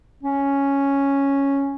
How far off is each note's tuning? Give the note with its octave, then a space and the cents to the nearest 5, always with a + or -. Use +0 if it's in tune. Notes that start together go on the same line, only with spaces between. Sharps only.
C#4 +0